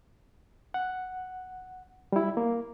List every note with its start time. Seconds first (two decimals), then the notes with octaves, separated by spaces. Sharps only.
0.74 F#5
2.12 G3 E4
2.37 A#3